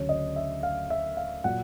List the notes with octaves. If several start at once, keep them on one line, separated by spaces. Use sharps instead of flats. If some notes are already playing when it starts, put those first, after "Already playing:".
Already playing: D2 C#3 F#3 C#5
D#5
E5
F5
E5
F5
A#2 F#3 F#5